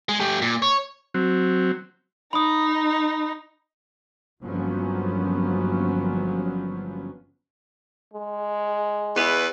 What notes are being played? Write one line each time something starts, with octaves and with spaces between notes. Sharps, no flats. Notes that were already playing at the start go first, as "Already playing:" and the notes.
G#3
A3 G4
A#2
C#5
F#3 C4
D#4 B5 D#6
G1 F3 F#3 A#3 B3 C#4
G#3
E2 E4 B4